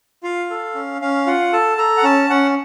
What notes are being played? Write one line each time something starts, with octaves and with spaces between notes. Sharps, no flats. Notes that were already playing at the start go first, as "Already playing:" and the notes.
F4 F5
A4
C#4
C#4 F5
F4 F#5
A4 A5
A4 A#5
F#5
C#4 A5
C#4 F#5